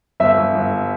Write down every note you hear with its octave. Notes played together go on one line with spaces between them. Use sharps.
G1 E5
G1
G1